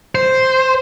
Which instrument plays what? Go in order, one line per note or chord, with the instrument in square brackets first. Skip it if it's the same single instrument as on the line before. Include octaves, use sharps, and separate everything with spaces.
[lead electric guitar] C5